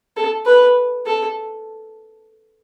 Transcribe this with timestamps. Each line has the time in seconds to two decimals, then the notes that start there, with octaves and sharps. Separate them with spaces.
0.17 A4
0.46 B4
1.06 A4